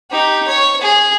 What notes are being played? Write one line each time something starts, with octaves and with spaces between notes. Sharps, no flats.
D#4 G4
C#5
G#4